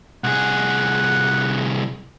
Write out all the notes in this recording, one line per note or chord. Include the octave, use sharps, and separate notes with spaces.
C2 G#4 F#5